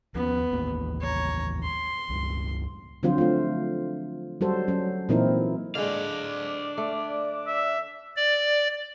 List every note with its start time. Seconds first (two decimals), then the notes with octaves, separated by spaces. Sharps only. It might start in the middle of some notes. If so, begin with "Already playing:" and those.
0.15 D#2 F3 B3 C#4
0.53 A1 D#2 A#3
1.01 C#5 A#5
1.63 C6
2.09 C#2 G2
3.03 D3 F3 F#3 C4 F4 C5
3.18 A3 F4
4.41 F#3 G3 F#4 A4 C5
4.68 F#3 C#4
5.09 A#2 E3 C4 D#4 E4 A#4
5.75 D3 G#3 D4 G#4 D5 F5
6.78 A3
7.47 E5
8.16 D5